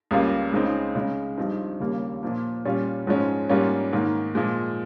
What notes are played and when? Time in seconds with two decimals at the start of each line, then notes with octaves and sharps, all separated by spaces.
0.11 C#2 C#3 G3 A#3 F4
0.53 C#2 C#3 G#3 C4 D#4
0.95 C#3 G#3 C#4
1.38 G2 F3 C4 D#4
1.80 D#2 C#3 G3 A#3
2.23 A#2 F3 A#3
2.65 A#2 G3 C#4 F4
3.07 G#2 F3 G#3 C#4
3.49 G#2 G3 A#3 C#4 F4
3.93 G#2 D#3 A#3
4.35 A#2 F3 G#3